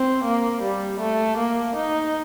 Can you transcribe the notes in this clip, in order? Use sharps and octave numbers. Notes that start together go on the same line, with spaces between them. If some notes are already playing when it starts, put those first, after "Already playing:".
Already playing: C4
A#3
G3
A3
A#3
D#4